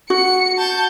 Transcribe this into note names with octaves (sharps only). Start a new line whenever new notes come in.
F#4 C#7
A5 G6